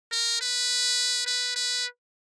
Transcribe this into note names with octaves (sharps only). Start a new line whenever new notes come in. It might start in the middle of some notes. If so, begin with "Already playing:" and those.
A#4
B4
B4
B4